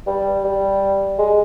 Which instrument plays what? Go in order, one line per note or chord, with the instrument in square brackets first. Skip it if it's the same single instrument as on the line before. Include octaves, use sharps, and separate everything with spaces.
[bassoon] G3
G3
G#3